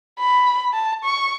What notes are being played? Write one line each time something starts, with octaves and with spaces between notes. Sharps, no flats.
B5
A5
C#6